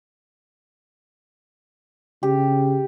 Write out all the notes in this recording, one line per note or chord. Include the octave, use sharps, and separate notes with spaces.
C#3 G4